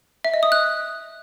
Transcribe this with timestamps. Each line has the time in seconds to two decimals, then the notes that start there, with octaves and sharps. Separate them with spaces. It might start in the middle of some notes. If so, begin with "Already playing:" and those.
0.25 E5
0.34 D#5
0.43 D#6
0.52 F#6